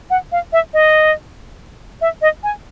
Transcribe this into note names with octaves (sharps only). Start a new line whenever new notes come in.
F#5
F5
E5
D#5
E5
D#5
G#5